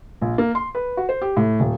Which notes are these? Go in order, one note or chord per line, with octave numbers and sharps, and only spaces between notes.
A#1
A#3
C6
B4
F#4
C5
G4
A2
D#1